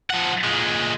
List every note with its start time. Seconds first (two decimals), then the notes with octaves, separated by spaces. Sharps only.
0.10 F3 F#5
0.44 A#2 G#3